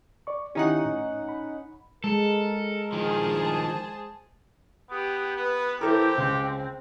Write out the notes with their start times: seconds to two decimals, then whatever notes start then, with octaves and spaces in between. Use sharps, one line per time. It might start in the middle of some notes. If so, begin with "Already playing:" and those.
0.27 D5 C#6
0.55 D#3 C#4 D#4 E4 G4 F#5
0.85 A2
1.29 B5
2.04 G#3 A4 A#4
2.92 D#3 F3 G#4 C5 A5
4.90 B3 G4
5.37 B3 B4
5.81 E3 E4 G4 A4 A#4 C5
6.17 C#2 C4